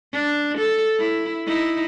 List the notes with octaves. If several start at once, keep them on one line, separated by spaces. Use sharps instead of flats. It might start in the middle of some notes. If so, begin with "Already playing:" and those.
D4
A4
E4
D#4 E4